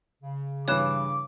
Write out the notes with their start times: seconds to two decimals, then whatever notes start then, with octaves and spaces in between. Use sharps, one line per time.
0.23 C#3
0.68 G2 E3 C#5 D6 F#6 E7